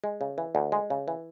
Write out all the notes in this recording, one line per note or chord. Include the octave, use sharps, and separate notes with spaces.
G#3
C#3
E3
D2
G#3
C#3
E3